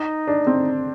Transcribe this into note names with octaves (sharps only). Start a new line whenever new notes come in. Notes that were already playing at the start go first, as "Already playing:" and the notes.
Already playing: D#4
D4
C4